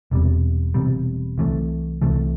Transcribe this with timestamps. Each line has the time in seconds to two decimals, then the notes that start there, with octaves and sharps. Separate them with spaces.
0.11 E1 E2 C3 G3
0.74 E1 E2 C3 G3
1.38 C2 C3 E3 A3
2.02 C2 C3 E3 A3